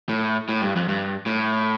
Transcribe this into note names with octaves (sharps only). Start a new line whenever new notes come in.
A2
A2
G2
F2
G2
A2